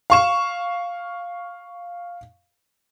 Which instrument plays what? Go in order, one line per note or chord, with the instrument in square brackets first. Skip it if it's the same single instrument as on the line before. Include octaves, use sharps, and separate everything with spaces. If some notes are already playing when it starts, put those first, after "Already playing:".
[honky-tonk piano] F5 C#6 E7